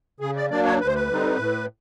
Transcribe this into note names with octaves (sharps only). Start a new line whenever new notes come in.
C#3 G#4
D5
F#3 A#3 D4 D5
C#5
D2 B4
C5
B4
D3 G3 C4 D#4
A2